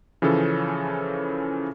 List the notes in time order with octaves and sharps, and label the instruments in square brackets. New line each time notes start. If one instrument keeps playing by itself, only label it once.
[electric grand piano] C#3 E3 F3 C#4 A4